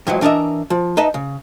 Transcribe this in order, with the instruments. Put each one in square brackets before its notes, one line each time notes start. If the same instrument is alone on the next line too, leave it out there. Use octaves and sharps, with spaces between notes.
[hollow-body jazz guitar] F2 G#2 E3 F#3
E3 D4 A#4 D#5 E5
F3
D#4 B4 D#5 E5 A5
C#3